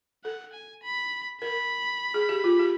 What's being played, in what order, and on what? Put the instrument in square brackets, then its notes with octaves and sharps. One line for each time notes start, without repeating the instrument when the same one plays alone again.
[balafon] A4 [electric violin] F#5
[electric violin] G#5
B5
[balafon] A#4 [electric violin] B5
[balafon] G#4
G4
F4
G4